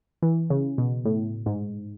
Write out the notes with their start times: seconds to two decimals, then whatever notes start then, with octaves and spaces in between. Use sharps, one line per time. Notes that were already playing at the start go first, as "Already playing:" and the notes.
0.22 E3
0.50 C#3
0.78 B2
1.05 A2
1.46 G#2